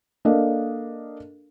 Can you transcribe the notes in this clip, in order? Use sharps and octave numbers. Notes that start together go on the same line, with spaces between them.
A#3 D4 A4 A#4 D#5 F5